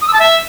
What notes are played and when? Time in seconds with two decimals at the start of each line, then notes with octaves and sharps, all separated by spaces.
0.02 D#6
0.07 E6
0.13 A5
0.19 E5